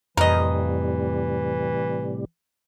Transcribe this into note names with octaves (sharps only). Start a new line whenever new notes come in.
F2 A2 C3 E3 G3 A#4 D#5